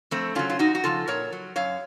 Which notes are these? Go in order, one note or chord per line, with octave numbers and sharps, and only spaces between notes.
F2 A3 C4
C#3 F#3 C#4 F4
F4
F2 D#4 F#4
F#4
C#3 F3 F4 A4
A#2 A#4 C#5
F#3
F#2 C#5 F5